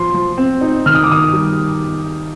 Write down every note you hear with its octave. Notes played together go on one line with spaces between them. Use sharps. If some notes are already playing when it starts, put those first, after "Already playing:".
Already playing: F3 C6
F3
C4
D#4
D#3 F6
D#6
D6
D#3 D#6
G3